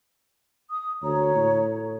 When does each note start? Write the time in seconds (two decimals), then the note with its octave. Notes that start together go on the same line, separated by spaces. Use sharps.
0.69 D#6
1.02 D2 C#5 A#5
1.36 A2